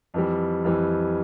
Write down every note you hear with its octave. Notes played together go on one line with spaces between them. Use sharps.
F2 E3 G3
F2 E3 G3